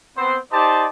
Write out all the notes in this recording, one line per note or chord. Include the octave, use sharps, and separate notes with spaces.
B3 C4 C5
D#4 G4 C5 D5 D#5 A5